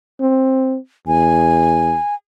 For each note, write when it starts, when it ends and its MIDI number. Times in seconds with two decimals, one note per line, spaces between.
0.21 0.76 60
1.07 1.97 40
1.07 2.14 80